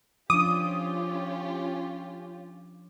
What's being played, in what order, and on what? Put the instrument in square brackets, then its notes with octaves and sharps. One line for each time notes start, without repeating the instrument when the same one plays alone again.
[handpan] F3 D4 [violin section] C#4 F4 G4 [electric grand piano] D6 [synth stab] D#6